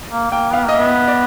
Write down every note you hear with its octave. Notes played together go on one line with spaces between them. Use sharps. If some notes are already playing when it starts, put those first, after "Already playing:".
A#3
A#3 G5
B3 F5
A#3 D#5
B3 E5
D5